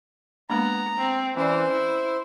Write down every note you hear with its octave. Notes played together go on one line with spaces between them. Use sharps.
G#3 A#3 B3 D4 A#5
C4
E3 C#4 C5 D5
E4